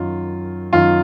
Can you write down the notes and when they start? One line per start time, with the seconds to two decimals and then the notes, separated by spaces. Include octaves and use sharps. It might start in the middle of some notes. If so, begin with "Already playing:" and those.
Already playing: F#2 D#3 F4
0.73 F#2 D#3 F4